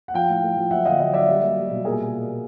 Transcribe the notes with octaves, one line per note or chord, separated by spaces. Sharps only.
F#5
F3 F5 G5
A2
A3
F3
F#3 E5 F#5
D3 D#5 F5
F#3 D#5 F5
F#3 D5 E5
G3
A#3
G3
B2
A#2 G#4 A#4